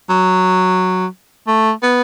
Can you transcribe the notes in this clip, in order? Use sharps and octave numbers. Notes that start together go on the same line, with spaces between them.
F#3
A3
B3